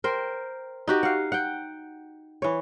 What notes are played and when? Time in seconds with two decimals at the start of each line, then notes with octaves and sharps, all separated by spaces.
0.04 A#4 C5 G5
0.88 D#4 F#4 G4
1.03 F5 F#5
1.32 F#5 G5
2.42 E3 C#5